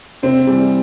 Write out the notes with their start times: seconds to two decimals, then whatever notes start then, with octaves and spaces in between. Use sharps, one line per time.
0.23 C3 C4
0.47 E3 G3